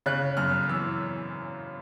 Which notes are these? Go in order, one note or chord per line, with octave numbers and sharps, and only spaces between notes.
C#3 F#6
F#2 F6
E3 E6